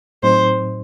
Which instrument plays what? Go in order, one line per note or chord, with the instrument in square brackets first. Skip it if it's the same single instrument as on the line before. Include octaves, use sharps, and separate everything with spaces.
[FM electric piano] A2 F#3 C4 D#4 [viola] C5